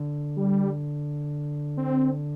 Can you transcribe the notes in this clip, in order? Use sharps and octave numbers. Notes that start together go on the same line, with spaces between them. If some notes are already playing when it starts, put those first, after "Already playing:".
Already playing: D3
G3
C4